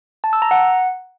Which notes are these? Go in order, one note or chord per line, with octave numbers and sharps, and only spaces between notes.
A5
E6
A#5
F#5